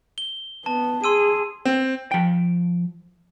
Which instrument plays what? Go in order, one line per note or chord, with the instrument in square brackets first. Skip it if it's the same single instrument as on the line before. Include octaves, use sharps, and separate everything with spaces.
[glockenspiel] G7
[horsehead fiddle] B3 [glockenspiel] A5
[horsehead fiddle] G#4 [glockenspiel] C6 E6 D#7
[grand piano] C4
[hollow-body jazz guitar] F3 G5